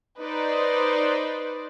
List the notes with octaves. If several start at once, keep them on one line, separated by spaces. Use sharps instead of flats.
D#4 B4 C5 D5